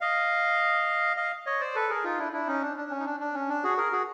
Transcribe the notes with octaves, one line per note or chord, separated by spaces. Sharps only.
D#5 F5
D#5 F5
C#5 D#5
C5 D5
A4 B4
G#4 A#4
D#4 F4
D4 E4
D4 E4
C#4 D#4
D4
D4
C#4
D#4
D4
D4
C#4
D4
F#4 G#4
G#4 A#4
F#4 G#4